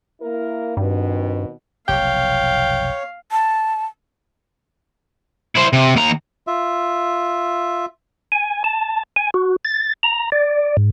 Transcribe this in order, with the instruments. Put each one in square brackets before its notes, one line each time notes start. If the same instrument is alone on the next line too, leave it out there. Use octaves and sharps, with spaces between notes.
[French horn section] A#3 E4 A#4
[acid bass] G2 [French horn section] B2 D#3 C4
[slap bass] F1 B1 [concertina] C#5 [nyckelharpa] F5 [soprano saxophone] G5
[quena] A5
[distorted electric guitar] E4 C5
C3
D#2 A#5
[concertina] F4 E5
[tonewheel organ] G#5
A5
G#5
F#4
A6
A#5
D5
G#2